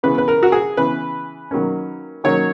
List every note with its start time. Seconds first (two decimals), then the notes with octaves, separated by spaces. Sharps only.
0.03 C#3 E3 B3 B4
0.18 B4
0.28 A#4
0.43 F#4
0.52 G#4
0.77 C#3 E3 B3 B4
1.51 D#3 F#3 A#3 C#4
2.24 D#3 F#3 A#3 C#4 C#5